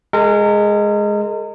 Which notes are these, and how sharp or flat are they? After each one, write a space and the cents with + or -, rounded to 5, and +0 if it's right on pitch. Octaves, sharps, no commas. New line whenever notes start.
G#3 +0 A#4 -35